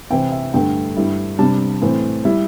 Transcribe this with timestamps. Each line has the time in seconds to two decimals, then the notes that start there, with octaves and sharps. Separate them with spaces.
0.11 C3 E3 C4 E4 G5
0.32 E5
0.54 G2 D3 A3 G5
0.97 G2 G3 E4
1.38 C3 G3 D4 A5
1.82 A2 E3 C4
2.25 G3 E4